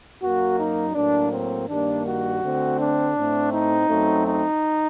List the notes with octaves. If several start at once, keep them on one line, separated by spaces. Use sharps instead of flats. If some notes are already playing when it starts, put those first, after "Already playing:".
F#2 F#3 A#3 F#4
D#4
A2 F#3 A#3 D4
C4
G2 D#3 G3 A#3 D4
F#4
D3 A3 C4
D4
A2 A3 C4
D#4
F#2 F#3 A3 C4
D#4